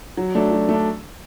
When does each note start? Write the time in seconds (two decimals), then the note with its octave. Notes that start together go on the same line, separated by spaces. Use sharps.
0.17 F#3
0.35 A3 D4
0.52 F#3
0.69 A3 D4